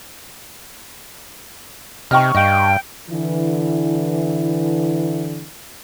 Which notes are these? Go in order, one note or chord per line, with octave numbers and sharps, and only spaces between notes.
C3 D#5 G5 A#5 C#6 F6
G2 D#5 F5 G5
D3 E3 E4